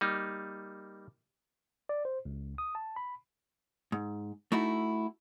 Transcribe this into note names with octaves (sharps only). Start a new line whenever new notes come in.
G3 A#3 D#4
D5
C5
C#2
D#6
A5
B5
G#2
A3 D#4 E4 F#4